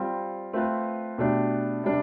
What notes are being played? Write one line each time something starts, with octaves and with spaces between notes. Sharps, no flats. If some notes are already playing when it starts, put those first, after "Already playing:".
Already playing: G3 C4 F4
A3 C4 F4 B4
B2 A3 D4 G4
C3 G3 D4